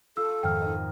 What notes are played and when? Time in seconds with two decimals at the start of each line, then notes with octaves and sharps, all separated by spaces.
0.17 F4 A4 E6
0.43 F2 G#2 D#3 G5 F6
0.62 D#4 D#5